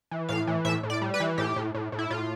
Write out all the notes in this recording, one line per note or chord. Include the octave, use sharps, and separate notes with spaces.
E3
A2 F5
E3
A2 E5
A2
D5
G3
B4
E3
A2 G4
A2
A2
A2
E4
A2 F4